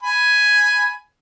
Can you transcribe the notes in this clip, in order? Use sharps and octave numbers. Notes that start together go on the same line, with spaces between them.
G#5 B5